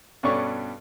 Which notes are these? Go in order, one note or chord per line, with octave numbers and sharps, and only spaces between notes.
G2 B2 C#4 A4 D5 C#6